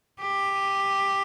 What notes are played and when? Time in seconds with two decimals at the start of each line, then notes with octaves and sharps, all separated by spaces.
0.21 G4